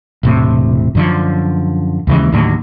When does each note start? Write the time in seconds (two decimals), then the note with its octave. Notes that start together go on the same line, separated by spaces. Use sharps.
0.23 E1 A2 C3
0.95 F#2 D3 F3
2.07 D#2 C#3 E3 G#3
2.32 D#2 A2 D3 F#3